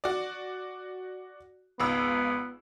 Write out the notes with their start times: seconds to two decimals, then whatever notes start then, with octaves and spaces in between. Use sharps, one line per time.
0.04 F#4 D5
1.80 G#1 C#2 B3 E6